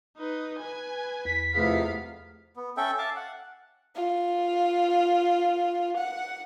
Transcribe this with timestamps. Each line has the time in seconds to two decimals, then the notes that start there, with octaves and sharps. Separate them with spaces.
0.18 D#4 B4
0.59 B4 G#5
1.25 E2 B6
1.55 F2 C3 A3 B3 E4 G#4 F5
2.56 B3
2.77 C#4 A4 E5 G5
2.98 E5 F5 A5 D6
3.16 F#5
3.96 F4
5.97 F#5